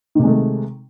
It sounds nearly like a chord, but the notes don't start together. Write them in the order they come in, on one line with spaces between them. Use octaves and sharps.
D#3 C3 G#3 A3